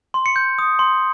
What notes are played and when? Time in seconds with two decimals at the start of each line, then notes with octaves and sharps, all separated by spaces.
0.14 C6
0.26 C#7
0.36 G6
0.58 D#6
0.79 C6